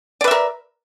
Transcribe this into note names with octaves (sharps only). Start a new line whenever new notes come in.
A#4 B4 D5 E5